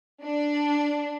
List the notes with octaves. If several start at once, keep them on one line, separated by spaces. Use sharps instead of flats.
D4